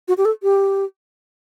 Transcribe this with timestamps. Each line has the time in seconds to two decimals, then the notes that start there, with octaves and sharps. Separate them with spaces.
0.08 F#4
0.17 G4
0.25 A4
0.43 G4